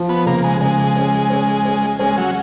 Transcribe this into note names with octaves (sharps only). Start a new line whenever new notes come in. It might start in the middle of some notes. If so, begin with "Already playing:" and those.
Already playing: F3
B3
C#3 A#3
G#3
C#3 G#3
C#4
C#4
C#4
G#3 C#4
F#3